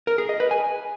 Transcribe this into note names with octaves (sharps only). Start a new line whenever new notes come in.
A#4
G#4
D#5
B4
G#5